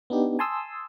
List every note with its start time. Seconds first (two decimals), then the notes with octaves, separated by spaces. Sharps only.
0.10 B3 D4 D#4 G4
0.39 G#5 A5 C6 D#6 E6